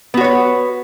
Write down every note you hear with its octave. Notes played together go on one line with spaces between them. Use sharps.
B3 F#4 B4 C#5